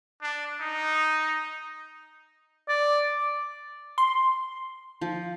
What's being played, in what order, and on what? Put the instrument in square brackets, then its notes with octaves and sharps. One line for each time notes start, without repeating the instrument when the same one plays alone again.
[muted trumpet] D4
D#4
[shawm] D5
[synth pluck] C6
[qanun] F3